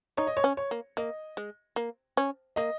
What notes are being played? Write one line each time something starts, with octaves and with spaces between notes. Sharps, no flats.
D#4 C#5
D#5
C#5
C#4
C#5
A#3
A#3 D#5
G#3
A#3
C#4
A#3 D#5